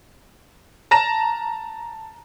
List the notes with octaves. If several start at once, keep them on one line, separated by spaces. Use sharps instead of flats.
A5 A#5 A#6 E7